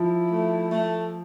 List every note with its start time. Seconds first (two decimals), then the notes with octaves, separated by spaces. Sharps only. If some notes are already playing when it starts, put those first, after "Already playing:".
Already playing: F3 E4
0.32 A3
0.71 A3